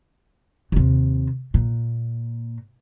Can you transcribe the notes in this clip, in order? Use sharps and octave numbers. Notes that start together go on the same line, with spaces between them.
D#2 C3
A#2